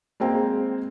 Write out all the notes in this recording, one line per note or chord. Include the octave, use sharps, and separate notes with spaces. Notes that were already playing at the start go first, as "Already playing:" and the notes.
G#3 A#3 C4 G5